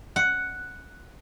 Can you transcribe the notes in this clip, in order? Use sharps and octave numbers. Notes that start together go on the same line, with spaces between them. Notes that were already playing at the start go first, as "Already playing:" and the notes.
F#5